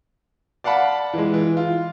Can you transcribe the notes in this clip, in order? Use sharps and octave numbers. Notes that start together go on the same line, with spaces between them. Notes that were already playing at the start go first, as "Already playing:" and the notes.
D5 F5 F#5 A5 B5
E3 G#3
E3
F4